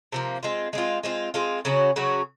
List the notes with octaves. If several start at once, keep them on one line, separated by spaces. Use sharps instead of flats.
C3 F3 A#3
G#3 C4 F4
G#3 C4 F4
G#3 C4 F4
G#3 C4 F4
C#3 F#3 C#4 F#4
C#3 F#3 C#4 F#4